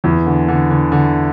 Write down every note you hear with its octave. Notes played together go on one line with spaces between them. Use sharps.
E2 E3
D3
D3
D3
D3